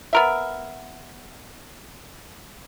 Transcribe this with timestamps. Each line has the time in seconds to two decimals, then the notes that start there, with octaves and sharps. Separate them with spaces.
0.13 B3 A#4 E5